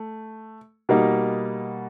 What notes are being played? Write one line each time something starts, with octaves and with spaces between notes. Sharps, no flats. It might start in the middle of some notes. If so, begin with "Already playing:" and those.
Already playing: A3
B2 G3 A#3 D#4